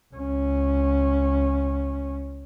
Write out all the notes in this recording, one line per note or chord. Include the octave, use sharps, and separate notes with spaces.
C#2 C#4